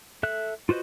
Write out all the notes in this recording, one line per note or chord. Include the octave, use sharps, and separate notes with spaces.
A4 E5 F#6
F4 F#4 B4 C5 D#5